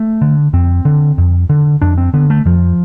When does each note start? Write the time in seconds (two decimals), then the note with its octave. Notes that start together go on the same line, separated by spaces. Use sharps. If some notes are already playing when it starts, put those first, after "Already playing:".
Already playing: A3
0.21 D3
0.53 F2 C4
0.85 D3
1.18 F2
1.49 D3
1.82 F2 D4
1.98 C4
2.14 D3 B3
2.30 A3
2.45 F2 F3